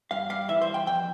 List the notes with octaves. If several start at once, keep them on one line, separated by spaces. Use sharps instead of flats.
G2 F5
G3 F5
E3 E5
C5
G2
G5
F2 G5